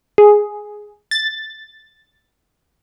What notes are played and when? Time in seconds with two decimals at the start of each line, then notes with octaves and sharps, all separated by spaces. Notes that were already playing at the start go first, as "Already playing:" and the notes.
0.18 G#4
1.11 A6